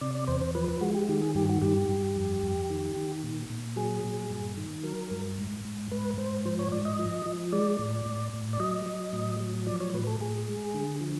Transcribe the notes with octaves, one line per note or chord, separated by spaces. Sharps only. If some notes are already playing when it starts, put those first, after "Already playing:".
C3 D5
D5
E2 C5
C5
F3 B4
B4
G#3 F#4
G4
D#3 G4
G#4
G2 G4
F#4
G2 G4
G2
F2
F2
D#3
D#3
A#2
A#2
F#3 G#4
A#2
G2
D#3
F#3 A#4
G2
G#2
G#2
G#2 B4
G#2 C5
F3 C5
C#5
G#2 D5
D#5
F3
F3
G#3 D5
A2
A2
A2
D5
F#3 D#5
F#3
A2
F#3
F3 D5
C#5
A2 B4
A4
A2 G#4
G#3
D3
F3